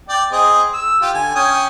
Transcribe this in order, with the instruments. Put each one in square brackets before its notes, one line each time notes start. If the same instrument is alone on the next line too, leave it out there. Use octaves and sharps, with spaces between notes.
[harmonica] D5 G5
C4 G#4 D#5
E6
F4 G4
D3 G#5
C#4 G5 D#6